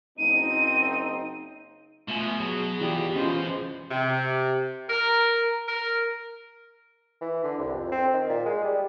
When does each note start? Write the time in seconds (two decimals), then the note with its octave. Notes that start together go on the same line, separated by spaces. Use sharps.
0.18 F#1 C4 D#4 D#7
2.08 B2 A3 F4 E5 G#5
2.40 F#3 G#4
2.81 E3 E4 F4 G4 D5
3.16 E3 C#4 F4 G#4 C5 D#5
3.90 C3
4.89 A#4
5.66 A#4
7.21 E3
7.44 D3
7.58 C2
7.74 F2
7.92 C4
8.14 D#3
8.29 A#2
8.46 G#3
8.64 G3